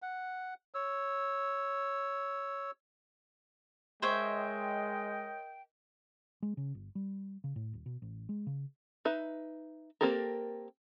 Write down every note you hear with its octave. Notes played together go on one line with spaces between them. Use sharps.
F#5
C#5 E6
G#3 A#4 C5 C#5 D#5 E5 G5
G#3
C#3
G1
G3
C#3
A2
D#1
B2
A1
G#3
C#3
D#4 B4 E5
A#3 C4 G4 A4 A#4